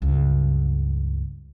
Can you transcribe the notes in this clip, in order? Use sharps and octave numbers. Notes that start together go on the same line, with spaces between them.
C#2 G2